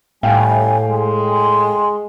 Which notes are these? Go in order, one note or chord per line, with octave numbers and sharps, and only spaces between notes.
A2 G3 F5 G5 G#5
G#3
C6